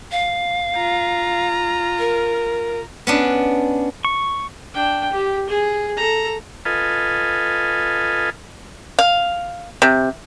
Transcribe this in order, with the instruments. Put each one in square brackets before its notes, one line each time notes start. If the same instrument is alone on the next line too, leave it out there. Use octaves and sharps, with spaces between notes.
[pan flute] F5
[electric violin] F4 A#5
[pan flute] A#4
[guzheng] B3 C#4 D4
[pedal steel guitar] C#6
[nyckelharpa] D4 G5
G4
G#4
A4 A#5
[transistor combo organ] F4 A4 B4 D#5 F5 G#5
[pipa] F5
C3